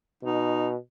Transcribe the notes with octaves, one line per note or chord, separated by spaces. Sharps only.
B2 D#4